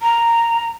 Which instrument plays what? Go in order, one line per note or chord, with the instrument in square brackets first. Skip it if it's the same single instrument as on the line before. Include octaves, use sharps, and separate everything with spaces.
[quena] A#5